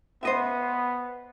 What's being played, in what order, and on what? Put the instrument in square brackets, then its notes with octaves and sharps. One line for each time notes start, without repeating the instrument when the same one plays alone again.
[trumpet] B3 [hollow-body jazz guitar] C5 D#5 E5